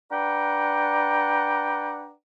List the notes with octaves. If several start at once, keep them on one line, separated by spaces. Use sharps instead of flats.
D4 B4 D5 F#5 G5 A#5